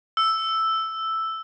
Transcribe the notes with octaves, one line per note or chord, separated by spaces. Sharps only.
E6